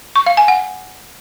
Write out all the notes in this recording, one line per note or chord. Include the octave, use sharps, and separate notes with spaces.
C#6
F5
G#5
F#5